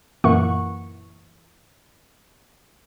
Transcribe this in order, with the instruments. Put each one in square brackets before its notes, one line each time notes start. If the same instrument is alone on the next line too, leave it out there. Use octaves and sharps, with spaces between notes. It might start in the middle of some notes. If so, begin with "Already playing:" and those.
[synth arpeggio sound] F#2 A#2 E3 A#3 F#5 C#6